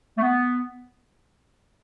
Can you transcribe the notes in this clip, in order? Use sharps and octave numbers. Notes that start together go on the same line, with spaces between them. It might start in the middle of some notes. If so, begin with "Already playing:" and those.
A3
B3